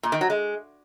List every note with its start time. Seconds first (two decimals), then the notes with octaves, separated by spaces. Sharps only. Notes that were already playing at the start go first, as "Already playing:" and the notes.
0.03 A#2
0.12 D#3
0.21 F#3
0.30 G#3